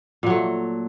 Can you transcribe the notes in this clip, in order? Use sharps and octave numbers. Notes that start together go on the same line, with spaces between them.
A#2 F#3 A3